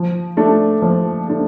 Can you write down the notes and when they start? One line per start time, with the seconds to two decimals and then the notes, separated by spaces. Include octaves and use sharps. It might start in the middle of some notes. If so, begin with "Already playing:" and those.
Already playing: F3
0.37 A3 D4
0.82 F3
1.28 A3 D4